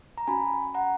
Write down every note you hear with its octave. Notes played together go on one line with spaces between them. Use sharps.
A#5
C#4 F#4 G#5 B5
F#5 A#5